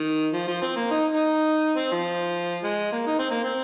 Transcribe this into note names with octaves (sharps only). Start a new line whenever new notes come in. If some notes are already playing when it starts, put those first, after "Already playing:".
Already playing: D#3
F3
F3
C4
A#3
D#4
D#4
C4
F3
G#3
A#3
D#4
C4
A#3
C4